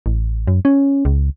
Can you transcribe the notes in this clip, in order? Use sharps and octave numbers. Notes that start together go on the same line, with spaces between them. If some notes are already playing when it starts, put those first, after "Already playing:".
A1
F#2
C#4
C#2